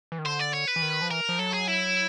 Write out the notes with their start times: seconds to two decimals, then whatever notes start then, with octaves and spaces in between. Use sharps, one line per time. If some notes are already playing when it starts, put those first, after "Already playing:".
0.12 E3
0.19 D#3
0.25 D3 C5
0.39 D5
0.54 C#5
0.68 B4
0.76 E3
0.82 D#3
1.02 F3
1.11 E3 A#4
1.29 F3
1.39 F#3 A4
1.53 G#4
1.68 E4